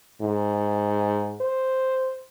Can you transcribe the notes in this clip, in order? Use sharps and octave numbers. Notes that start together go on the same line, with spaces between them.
G#2
C5